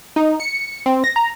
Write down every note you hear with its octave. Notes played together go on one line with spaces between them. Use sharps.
D#4
C#7
C4
A#6
A#5